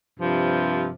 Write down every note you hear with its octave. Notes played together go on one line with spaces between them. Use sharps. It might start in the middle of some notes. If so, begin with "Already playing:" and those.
G2 C3 F3